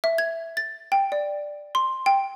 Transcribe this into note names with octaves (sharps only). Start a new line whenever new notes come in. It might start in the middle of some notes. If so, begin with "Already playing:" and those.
E5
G#6
A6
G5
D5
C6
G5